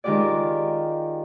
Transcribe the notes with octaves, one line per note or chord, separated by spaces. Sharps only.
D#3 G#3 F4 G4 D5